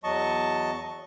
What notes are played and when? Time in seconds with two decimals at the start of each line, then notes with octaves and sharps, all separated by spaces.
0.04 E2 F#3 D#5 A5 C#6